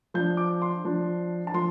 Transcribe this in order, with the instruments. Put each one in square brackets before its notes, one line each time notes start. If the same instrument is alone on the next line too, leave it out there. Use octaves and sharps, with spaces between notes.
[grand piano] F3 D4 G6
D6
C6
F3 D4
A5
F3 C6